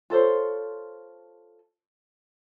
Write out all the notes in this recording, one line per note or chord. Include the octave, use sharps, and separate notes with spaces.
F4 A4 C5 C#5